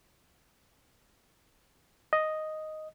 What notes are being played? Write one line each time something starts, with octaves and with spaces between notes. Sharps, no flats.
D#5